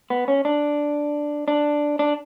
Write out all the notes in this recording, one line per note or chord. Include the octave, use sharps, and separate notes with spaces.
B3
C#4
D4
D4
D4